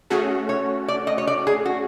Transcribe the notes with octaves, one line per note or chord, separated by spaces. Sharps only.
A3 C#4 F#4 G#4
C#5
D5
D#5
C#5
D5
G#4
F#4